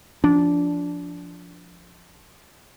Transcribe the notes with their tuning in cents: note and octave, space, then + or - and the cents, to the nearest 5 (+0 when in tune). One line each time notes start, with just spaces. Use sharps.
F3 +0 D4 -15